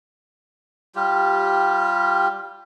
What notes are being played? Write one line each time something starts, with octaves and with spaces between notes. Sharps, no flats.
G3 F4 G4